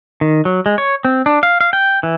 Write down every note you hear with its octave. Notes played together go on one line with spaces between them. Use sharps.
D#3
F#3
G#3
C#5
C4
D4
F5
F5
G5
E3